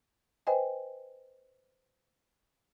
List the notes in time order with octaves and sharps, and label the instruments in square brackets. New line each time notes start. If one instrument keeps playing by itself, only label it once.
[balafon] B4 C5 D#5 G5 G#5